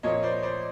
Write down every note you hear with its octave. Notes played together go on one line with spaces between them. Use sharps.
A#2 F3 A#3 C#5 D#5
C5 D5
C5 D5